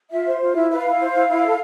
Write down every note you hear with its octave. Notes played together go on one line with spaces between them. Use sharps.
F4 E5
C5
F4
E4 E5
B4 E5
F5
E4
C5
E4
E4
A4